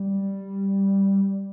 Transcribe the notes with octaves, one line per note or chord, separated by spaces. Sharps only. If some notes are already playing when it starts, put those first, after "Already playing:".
Already playing: G3